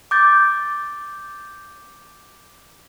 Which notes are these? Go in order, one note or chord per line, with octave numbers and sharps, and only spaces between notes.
D6 G6 A6